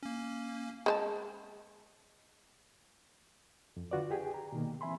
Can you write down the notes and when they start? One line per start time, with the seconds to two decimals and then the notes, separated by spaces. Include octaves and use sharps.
0.03 A#3 C#4
0.86 G#3 C5 A5
3.77 F2
3.91 D3 F4 F#4 B4 D5
4.11 G4 G#4 G5 G#5
4.34 A#5
4.52 B2 D#3 A#3
4.81 E3 C4 E5 G#5 B5 C6